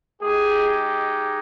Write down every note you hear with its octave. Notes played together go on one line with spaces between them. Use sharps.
G#3 D#4 G4 G#4